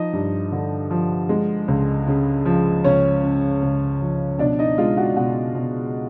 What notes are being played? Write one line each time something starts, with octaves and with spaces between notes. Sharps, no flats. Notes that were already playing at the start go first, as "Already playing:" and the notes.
Already playing: F3 D#4 D#5
G2
D3
F3
G#3
C#2
C#3
F3
C#2 C#4 C#5
C#3
C#2
F3
B2 D4 D5
D#4 D#5
G#3 F4 F5
F#4 F#5
B2 F#4 F#5
B2